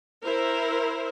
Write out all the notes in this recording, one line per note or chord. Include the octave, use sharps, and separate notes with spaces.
E4 A#4 C5